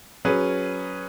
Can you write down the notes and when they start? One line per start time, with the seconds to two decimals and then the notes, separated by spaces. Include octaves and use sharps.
0.25 F#3 C#4 G#4 B4